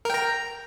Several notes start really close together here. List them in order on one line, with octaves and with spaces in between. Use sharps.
A#4 G5 A#5